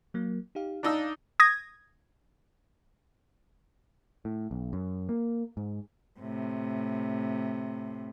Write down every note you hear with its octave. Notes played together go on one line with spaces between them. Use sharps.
F#3 A#3
D#4 G4 F5
D4 D#4 F5 A5 A#5 E6
D#6 G#6 A#6
A2
B1
F#2
A#3
G#2
A2 C3